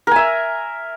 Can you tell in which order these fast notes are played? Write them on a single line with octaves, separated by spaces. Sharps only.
A#4 G#5 E5